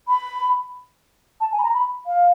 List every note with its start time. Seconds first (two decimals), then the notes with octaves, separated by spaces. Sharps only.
0.08 B5
1.41 A5
1.52 G#5
1.59 B5
1.63 A#5
1.74 B5
2.07 F5